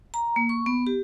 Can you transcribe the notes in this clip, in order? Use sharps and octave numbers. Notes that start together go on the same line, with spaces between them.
A#5
A#3
C#6
B3
G4